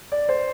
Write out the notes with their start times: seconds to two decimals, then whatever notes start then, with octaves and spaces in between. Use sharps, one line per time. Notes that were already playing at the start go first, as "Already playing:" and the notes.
0.12 D5
0.29 C5